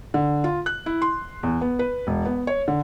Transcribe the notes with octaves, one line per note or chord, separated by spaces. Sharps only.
D3
F4
F#6
E4
C6
E2
B3
B4
E1
B3
C#5
D3